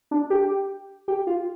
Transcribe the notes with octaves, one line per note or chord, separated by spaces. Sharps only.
D4
G4
G4
F4